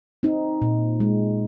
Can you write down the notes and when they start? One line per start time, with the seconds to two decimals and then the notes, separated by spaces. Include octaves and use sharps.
0.23 C4 D#4
0.62 A#2
1.00 G#3